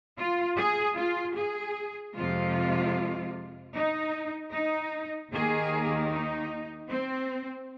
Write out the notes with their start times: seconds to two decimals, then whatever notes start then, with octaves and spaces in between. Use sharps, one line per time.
0.17 F4
0.57 G#4
0.96 F4
1.35 G#4
2.14 F2 C3 F3 G#3 F4
3.73 D#4
4.52 D#4
5.30 D#2 D#3 A#3 G#4
6.10 D#4
6.89 C4